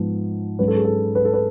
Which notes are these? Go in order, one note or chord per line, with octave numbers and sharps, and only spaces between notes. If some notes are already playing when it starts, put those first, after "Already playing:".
Already playing: G#2 F3 B3
G#2 F#3 C#4 B4
A4
G#4
A4
B4
A4
B4